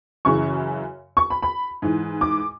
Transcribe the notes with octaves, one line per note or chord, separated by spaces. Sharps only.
F#2 C#3 E3 C#6
C#6
B5
B5
G#2 E3
D6